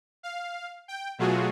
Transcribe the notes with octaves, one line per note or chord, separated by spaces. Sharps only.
F5
G5
B2 F#3 A3 F4 F#4 G#4